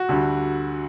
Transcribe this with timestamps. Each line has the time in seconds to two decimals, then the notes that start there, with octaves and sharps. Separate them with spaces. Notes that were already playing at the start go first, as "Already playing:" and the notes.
Already playing: F#4
0.09 D2 D3 G3